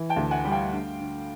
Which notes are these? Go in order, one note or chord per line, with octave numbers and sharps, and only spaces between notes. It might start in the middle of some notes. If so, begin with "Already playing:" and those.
Already playing: E3
G5 A5
D2
F#5 G#5
G3
F5 G5
D3
D3